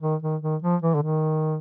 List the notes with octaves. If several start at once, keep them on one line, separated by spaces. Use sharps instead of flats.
D#3
D#3
D#3
F3
E3
D3
D#3